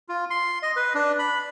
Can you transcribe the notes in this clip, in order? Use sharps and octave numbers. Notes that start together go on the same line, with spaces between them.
F4
C6
D#5
B4
D4
B5